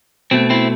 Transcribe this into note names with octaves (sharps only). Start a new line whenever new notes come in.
B2 A3 C4
C4 E4